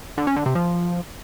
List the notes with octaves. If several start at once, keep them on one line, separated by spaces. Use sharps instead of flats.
D3
C#4
D3
C3
F3